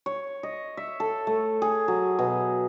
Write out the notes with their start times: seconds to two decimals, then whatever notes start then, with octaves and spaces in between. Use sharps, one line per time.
0.06 C#5
0.43 D#5
0.77 E5
1.00 A4
1.27 A3
1.62 G#4
1.88 F#3
2.19 B2